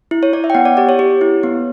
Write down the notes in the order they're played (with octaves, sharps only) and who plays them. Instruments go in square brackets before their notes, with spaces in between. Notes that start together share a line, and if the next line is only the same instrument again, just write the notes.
[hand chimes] E4
C#5
E4 D5
E5
G5
B3 F#5
D5
G4 D5
C#5
G4
E4
B3